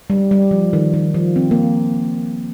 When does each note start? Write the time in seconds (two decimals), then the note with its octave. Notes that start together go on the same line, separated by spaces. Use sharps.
0.10 G3
0.31 G3
0.51 F3
0.73 D#3
0.94 D#3
1.14 F3
1.36 C4
1.51 A#3